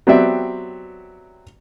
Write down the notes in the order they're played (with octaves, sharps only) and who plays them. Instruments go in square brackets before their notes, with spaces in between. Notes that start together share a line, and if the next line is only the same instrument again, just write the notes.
[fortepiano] F#3 B3 C4 G4 D5 E5